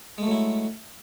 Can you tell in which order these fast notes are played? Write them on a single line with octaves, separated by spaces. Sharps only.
G#3 A3 F#3 E4